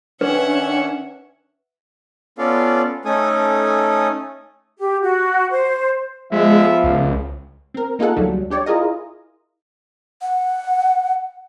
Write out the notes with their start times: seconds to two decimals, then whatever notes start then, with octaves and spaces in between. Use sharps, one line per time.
0.21 D#3 C#4 D4 B4 C#5 E5 F#5
2.38 B3 C#4 F4 A4 D5 F5
3.05 A3 C#4 D#4 A4 G#5 D#6
4.79 G4
5.03 F#4
5.50 C5
6.32 F3 G#3 B3 F4 E5
6.84 C#2
7.74 C4 A#4
7.99 A#3 D#4 F4 G#4 A4 F#5
8.16 D2 F#3 G3
8.50 D4 G4 C#5 D5
8.66 E4 F4 G#4 A#4 D#5
10.22 F#5